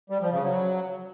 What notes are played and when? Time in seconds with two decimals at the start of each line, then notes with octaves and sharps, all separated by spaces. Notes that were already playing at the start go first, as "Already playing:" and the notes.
0.10 G3
0.21 F3
0.32 C#3
0.43 F#3